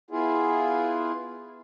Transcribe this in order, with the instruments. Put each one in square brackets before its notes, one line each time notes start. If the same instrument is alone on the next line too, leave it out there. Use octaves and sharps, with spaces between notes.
[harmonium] B3 E4 F4 G#4